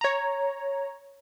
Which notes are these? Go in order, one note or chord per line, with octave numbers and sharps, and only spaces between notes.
C#5 A#5